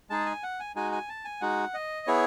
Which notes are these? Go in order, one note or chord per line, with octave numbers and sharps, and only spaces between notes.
G#3 D#4 G#4 A5
G#5
F#5
G#5
G#3 D#4 F#4 G#5
G#5
A5
G#5
G#3 D#4 F#4 F#5
D#5
B3 E4 G#4 C#5